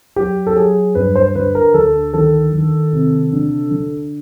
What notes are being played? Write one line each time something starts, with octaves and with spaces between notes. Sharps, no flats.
F#3 G4
A4
F#3 G#4
G2 B4
C5
D3 B4
A#4
D2 A4
D#3 A4
D#3
C3
D3
D3